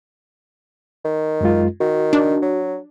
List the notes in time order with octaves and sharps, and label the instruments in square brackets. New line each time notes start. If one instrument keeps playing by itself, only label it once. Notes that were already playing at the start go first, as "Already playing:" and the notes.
[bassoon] D#3
[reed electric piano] F#2 G#3 F4
[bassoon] D#3 [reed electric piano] F#4
[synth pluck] D4
[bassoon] F#3